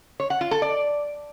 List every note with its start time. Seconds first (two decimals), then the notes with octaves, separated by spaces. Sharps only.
0.20 C#5
0.30 F#5
0.41 F4
0.51 A4
0.62 D5